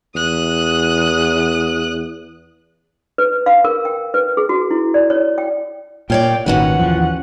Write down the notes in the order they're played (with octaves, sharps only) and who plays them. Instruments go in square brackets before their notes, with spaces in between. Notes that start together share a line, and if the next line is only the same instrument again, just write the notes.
[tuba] E2 [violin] D#6 F#6
[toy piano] B4
F5
A#4
G5
B4
G#4
F#4
E4
D5
C#5
G5
[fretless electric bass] A#2 [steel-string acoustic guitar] F4 C#5 D5 [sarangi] G5
[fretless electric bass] G#1 A#2 D#3 [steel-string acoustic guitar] C#4 F#4 B4 [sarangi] F#5
[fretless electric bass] D#2 E3 F3